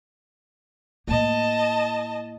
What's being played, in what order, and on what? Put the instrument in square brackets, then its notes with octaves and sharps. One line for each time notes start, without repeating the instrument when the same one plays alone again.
[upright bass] A2 A#3 [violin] D#5 A5